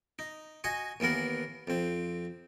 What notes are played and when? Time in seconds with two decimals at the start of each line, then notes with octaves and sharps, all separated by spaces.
0.19 D#4
0.64 F#4 D#5 G#5 C#6
1.00 D#2 E3 B3 A#4 F#5
1.67 F2 C4